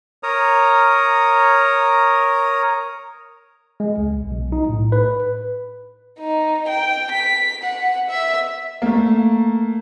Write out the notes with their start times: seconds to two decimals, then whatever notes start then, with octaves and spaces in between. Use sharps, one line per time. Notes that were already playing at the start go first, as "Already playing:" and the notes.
0.23 A#4 C#5 A#5 D#6
3.80 G#3
3.98 C#2
4.16 B1
4.31 B1
4.52 D#4
4.69 A2
4.92 B4
6.19 D#4
6.68 G5
7.11 B6
7.63 F#5
8.09 E5
8.82 A3 A#3